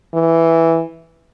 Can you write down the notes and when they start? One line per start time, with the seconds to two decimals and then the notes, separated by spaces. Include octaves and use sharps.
0.14 E3